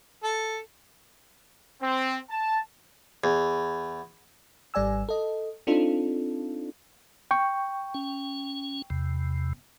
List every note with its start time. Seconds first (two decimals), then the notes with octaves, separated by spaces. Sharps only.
0.24 A4
1.83 C4
2.30 A5
3.24 E2
4.74 G#1 G3 D5 G#5 E6
5.09 A4 D#5
5.67 C4 D4 D#4 F4 A4
7.31 G5 C#6
7.94 C#4
8.90 E2 C3